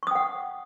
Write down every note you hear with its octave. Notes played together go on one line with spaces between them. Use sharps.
F#5 G5 C#6 D#6